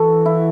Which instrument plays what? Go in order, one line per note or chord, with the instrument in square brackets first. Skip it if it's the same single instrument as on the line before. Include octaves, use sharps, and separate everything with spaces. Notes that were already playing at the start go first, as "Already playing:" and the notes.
Already playing: [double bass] E3 [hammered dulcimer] F#4 A4
[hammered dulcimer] E4